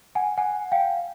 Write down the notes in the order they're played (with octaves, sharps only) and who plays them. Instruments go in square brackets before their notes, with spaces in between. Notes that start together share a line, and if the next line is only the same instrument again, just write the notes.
[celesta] F#5 G#5
F#5 G#5
F5 G5